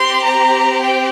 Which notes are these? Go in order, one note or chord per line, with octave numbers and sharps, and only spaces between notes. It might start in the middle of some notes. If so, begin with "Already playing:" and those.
Already playing: C4 G4 C6
A#5
G5